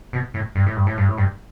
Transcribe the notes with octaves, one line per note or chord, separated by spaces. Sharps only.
B2
A2
G2
A2
G2
A2
G2
A2
G2